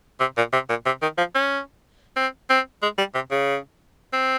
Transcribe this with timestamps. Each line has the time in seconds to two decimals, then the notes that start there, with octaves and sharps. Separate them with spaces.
0.20 C3
0.37 A#2
0.53 C3
0.69 A#2
0.86 C3
1.02 D#3
1.18 F3
1.35 C#4
2.17 C4
2.50 C4
2.83 G#3
2.98 G3
3.15 C3
3.31 C#3
4.13 C4